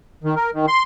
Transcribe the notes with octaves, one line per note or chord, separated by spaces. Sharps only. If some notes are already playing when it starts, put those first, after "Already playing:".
D#3
A#4
D#3
C6